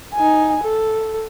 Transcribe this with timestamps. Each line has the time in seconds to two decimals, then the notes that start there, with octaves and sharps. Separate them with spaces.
0.15 D#4 G#5
0.63 A4